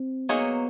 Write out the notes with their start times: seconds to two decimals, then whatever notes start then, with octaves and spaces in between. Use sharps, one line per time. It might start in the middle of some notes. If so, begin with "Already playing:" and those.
Already playing: C4
0.28 F#3 A#3 B3 D#4 G#4 C#5